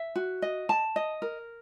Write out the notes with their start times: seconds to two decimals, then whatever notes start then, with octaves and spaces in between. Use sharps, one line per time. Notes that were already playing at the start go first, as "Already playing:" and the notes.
Already playing: E5
0.16 F#4
0.42 D#5
0.69 A5
0.96 D#5
1.22 A#4